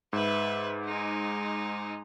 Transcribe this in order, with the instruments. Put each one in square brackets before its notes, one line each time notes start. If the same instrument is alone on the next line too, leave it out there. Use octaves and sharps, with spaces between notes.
[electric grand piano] G#2 [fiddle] B4 E5
[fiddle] G#3 D#4